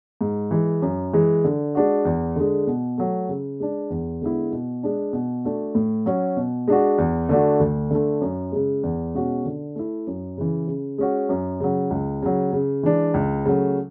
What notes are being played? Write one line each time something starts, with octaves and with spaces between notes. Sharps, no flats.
G#2
E3 G#3
F#2
E3 G#3
D3
G#3 D4 F#4
E2
D3 G#3
B2
F#3 A3
C#3
G#3 D4
E2
D3 G#3 B3 E4
B2
G#3 D4
B2
A3 D4 F#4
A2
F#3 C#4 F#4
B2
G#3 D4 F#4
E2
D3 A3 D4 F#4
D2
D3 A3
F#2
C#3 G#3
E2
B2 G#3 C#4 F#4
D3
A3 E4
F#2
C#3 E3
C#3
G#3 C#4 F#4
F#2
C#3 F#3
C#2
C#3 F#3
C#3
E3 G#3 D4
C#2
C#3 F#3 A3